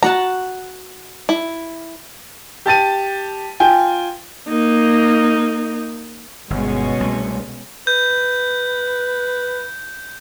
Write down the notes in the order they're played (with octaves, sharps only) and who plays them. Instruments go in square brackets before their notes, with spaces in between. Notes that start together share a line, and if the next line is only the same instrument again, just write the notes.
[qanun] F#4 F#5 A5 [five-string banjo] A#5
[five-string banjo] E4
[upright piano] G4 A5 A6 D#7
F4 G5 G#5
[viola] A#3 D#4
[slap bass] G1 [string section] B2 G#3 C#4
[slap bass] C2 A3
[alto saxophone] B4 [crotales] G6